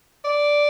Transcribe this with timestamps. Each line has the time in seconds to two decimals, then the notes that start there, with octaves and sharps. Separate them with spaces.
0.25 D5